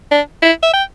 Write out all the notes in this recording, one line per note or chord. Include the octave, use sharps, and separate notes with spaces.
D4
E4
E5
G5